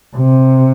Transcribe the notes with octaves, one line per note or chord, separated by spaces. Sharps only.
C3